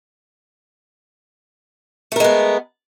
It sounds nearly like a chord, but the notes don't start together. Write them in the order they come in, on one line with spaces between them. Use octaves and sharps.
A3 A#4 G#3 B3